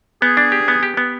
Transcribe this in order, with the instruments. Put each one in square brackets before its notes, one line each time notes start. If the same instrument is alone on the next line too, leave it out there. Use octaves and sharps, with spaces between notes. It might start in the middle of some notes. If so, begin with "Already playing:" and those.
[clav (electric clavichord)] B3 [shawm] G#4
[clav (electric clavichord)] D4
G4
B3
G4
B3